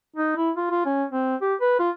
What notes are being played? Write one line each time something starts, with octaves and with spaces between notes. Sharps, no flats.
D#4
E4
F4
F4
C#4
C4
G4
B4
F4